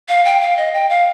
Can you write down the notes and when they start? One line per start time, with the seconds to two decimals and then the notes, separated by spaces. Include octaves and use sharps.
0.09 F5
0.25 G5
0.41 F5
0.57 D#5
0.74 G5
0.90 F5